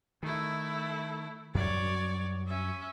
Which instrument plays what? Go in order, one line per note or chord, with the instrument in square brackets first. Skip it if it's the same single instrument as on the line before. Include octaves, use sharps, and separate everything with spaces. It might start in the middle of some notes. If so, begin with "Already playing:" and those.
[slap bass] D#3 [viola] A3 E4
[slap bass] F#2 F#3 G3 [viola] C#5 D5
[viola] C#4 E5